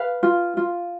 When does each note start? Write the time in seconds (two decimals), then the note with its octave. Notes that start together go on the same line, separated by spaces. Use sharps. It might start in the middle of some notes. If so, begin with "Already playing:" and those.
Already playing: B4 F5
0.23 F4
0.57 F4